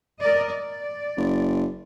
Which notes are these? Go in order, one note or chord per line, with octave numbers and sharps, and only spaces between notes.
A#4 D5 D#5
D5
F#1